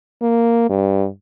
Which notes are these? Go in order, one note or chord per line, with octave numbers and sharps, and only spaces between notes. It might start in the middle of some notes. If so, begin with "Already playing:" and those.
A#3
G2